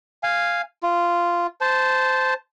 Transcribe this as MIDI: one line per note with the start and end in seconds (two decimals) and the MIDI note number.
0.23 0.62 77
0.23 0.62 80
0.83 1.47 65
1.61 2.34 72
1.61 2.34 81